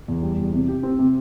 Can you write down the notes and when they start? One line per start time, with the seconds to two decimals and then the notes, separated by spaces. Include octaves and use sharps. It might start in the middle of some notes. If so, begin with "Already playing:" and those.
0.08 E2
0.23 G3
0.38 E2
0.53 C3
0.68 G4
0.83 C4
0.99 C3